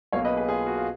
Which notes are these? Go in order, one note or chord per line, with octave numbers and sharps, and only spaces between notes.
B1 B2 A#3 C#5 F5
B4 D#5
G#4 B4
F4 G#4
F#4
F4